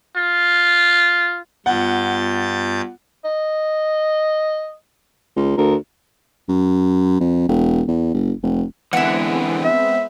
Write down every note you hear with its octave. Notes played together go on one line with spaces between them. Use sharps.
F4
G2 B3 F4 F#5 G6 A6
D#5
C#2
D2 A#4
F#2
F2
E1
E2
F#1
F1
D3 E3 G#3 B3 C4 E4 F#5
E5